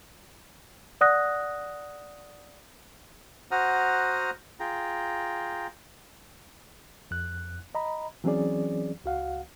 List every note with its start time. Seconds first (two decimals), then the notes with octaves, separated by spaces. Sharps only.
1.01 D5 F#5 D#6 F#6 A#6
3.51 F#4 C5 F#5 A#5 D#6 F6
4.60 F4 G#4 G5 A#5
7.11 F2 F#6
7.75 D#5 A#5 B5
8.24 E3 F#3 C4 C#4 G#4 D5
9.04 C#2 F#4 F5 F#5